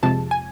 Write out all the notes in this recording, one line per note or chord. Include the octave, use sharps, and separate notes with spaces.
F2 C3 F3 G#3 A5
G#5